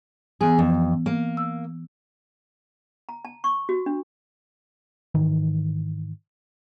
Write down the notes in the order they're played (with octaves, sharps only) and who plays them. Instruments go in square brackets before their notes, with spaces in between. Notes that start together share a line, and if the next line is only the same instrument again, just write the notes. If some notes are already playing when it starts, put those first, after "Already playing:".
[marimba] E3 B3 [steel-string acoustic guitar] G#4
[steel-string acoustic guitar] F2
A#3
[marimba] E6
[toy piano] A#5
A5
C#6
F#4
D4
[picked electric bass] G#2 D#3 E3